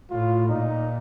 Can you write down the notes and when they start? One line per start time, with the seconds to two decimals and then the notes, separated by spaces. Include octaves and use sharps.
0.11 A2 F4
0.49 A#2 D#4